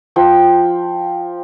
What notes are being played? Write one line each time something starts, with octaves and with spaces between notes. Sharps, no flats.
F3 G5